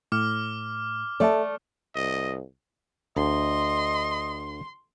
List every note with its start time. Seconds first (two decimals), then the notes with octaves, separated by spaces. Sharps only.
0.12 A2 D6 F6
1.20 A3 A4 D5 E5 A5
1.95 C2 D#5
3.17 D2 D#5 C6